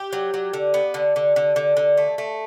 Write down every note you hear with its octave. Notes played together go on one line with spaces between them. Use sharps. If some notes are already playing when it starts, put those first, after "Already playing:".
Already playing: G4
F#3
F#3
D3
B3
D3
D3
D3
D3
D3
A3
A3